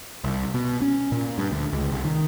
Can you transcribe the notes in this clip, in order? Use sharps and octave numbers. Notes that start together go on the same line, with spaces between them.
C2
B2
C#4
A#2
G2
D2
C#2
C2
D#3